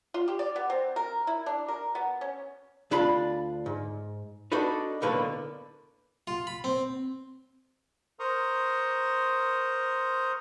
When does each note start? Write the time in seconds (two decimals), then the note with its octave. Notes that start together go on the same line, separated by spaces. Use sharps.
0.14 F4
0.28 G4
0.39 D5
0.56 B3
0.70 C4
0.96 A#4
1.27 E4
1.46 D4
1.68 A#4
1.95 B3
2.21 C#4
2.91 D2 D4 F4 B5
3.66 G#2
4.52 D4 D#4 F#4 A4 B4
5.02 B1 A2 D3 A#3 B4
6.27 F4
6.47 B5
6.64 C4
8.19 A#4 C5 A#5 C6 C#6 D#6